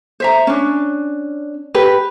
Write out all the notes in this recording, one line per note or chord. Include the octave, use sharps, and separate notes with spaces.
C5 E5 A#5
C#4 D4
G4 B4